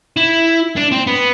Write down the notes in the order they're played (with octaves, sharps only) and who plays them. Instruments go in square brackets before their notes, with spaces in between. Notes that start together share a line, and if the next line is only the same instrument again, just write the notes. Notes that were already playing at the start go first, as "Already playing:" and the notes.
[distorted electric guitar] E4
D4
C4
B3